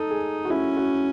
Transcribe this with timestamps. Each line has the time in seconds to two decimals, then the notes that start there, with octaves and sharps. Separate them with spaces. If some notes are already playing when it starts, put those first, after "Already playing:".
Already playing: D#4 A4
0.11 G#4
0.45 F#4
0.50 C#4 E4
0.77 F#4